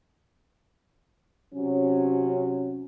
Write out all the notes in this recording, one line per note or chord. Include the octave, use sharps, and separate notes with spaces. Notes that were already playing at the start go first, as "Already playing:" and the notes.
C3 F#3 C#4